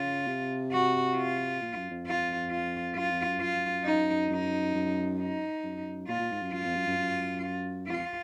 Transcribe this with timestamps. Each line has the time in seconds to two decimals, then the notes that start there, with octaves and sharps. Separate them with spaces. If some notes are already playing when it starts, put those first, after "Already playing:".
Already playing: C#3 F4
0.27 C3
0.72 F#4
1.16 F4
1.62 A#2
1.76 F#2
1.91 F2
2.06 F4
2.50 F4
2.96 F#2 F4
3.10 F2
3.25 F#2
3.41 F4
3.85 D#4
4.30 F#2 D#4
4.75 F#2
5.19 D#4
5.64 F#2
6.08 A#2 F4
6.20 A#2
6.31 G#2
6.42 F#2
6.53 F#2 F4
6.64 F2
6.76 F#2
6.87 F#2
6.98 F#2
7.87 F2 F4